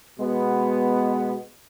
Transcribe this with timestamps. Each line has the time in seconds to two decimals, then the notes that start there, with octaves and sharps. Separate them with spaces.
0.18 B2 G#3 B3